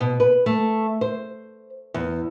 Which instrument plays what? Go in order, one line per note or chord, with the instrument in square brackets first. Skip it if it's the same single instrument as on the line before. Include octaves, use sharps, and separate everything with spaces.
[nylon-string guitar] B2
B4
A3
C5
E2